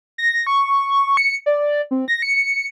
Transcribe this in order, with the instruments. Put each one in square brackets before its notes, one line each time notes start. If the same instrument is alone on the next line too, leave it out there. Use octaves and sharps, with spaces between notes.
[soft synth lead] A#6
C#6
C#7
D5
C4
A#6
C#7